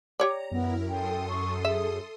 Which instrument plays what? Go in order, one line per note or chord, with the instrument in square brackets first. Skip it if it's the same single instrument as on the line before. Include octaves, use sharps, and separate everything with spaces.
[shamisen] G4 C#5 D5 [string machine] A#5
[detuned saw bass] F#2 [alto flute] B3 [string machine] E4 A#4
[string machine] A4 C6 D#6 [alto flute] G5
[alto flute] C#6
[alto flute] G#4 [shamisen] E5